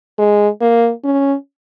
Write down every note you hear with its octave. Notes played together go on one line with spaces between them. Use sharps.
G#3
A#3
C#4